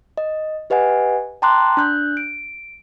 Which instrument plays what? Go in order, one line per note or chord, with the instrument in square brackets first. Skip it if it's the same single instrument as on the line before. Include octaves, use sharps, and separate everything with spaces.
[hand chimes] D#5
G4 B4 D#5 F#5 G#5
G5 A5 A#5 C6 D6 F#6
D4 F#6 G6
D7